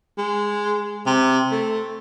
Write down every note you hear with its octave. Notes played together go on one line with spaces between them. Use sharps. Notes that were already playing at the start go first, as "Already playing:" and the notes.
G#3
C3
A3